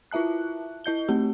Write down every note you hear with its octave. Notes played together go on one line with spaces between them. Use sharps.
E4 F4 E5 A5 F#6
E4 D#5 G6 G7
A3 C4 G4